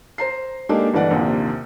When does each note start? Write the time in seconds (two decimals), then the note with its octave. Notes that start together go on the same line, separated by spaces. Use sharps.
0.18 C5 A#5 C7
0.69 G#3 A#3 D4 D#4 G4 A4
0.94 G1 E3 D5 F#5
1.11 A#1 D#2 C3